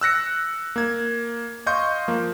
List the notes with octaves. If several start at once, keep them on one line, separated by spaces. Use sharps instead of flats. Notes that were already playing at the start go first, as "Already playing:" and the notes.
E6 F#6 A#6 C#7
A#3 G#6
D#5 F5 C6 C#6 G6
F3 A#3